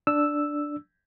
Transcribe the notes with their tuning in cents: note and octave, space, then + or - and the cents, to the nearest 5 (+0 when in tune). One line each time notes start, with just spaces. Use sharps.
D4 +0 E6 +0